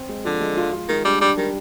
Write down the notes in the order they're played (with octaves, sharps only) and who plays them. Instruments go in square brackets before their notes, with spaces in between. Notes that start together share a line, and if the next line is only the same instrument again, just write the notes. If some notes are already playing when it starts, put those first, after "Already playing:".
Already playing: [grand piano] C4
G#3
[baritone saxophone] D3 [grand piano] F3
[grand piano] G#3
F4
F4
[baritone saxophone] D#3 [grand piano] G#3
[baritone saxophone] G3 [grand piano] D4
[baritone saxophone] G3 [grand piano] D4
[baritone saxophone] D#3 [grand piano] G3